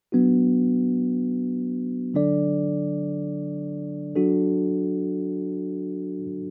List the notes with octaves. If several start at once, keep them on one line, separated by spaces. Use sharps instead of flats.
F#3 B3 D4 F#4
D3 F#3 D4 A4 D5
F#3 D4 F#4 A4